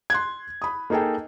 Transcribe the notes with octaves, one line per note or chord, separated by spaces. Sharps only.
C6 F#6 G#6
B5 D#6
A#3 D#4 G#4 A4 G5